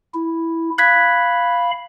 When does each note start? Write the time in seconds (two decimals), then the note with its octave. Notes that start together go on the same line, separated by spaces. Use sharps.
0.14 E4
0.78 F5 B5 F#6 G#6 B6